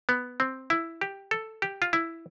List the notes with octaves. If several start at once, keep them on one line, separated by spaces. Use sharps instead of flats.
B3
C4
E4
G4
A4
G4
F4
E4